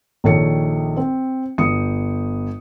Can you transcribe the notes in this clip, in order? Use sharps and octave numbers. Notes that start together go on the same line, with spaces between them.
A#1 D#3 A4 C#5 C#7
C4
G1 D#6 C#7